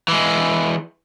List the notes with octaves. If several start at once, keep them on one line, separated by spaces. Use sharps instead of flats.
E3 G#3